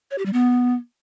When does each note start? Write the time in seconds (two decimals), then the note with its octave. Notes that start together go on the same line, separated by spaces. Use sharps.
0.11 C#5
0.18 G4
0.26 G3
0.33 B3